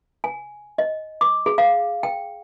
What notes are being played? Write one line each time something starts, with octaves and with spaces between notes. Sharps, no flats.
G#5
D#5
D6
G#4
F5
G5